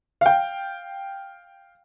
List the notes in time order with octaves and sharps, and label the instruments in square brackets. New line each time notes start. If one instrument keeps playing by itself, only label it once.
[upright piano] F5 G5